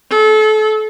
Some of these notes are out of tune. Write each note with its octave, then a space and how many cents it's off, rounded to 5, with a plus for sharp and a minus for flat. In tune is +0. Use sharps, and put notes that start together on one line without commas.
A4 -30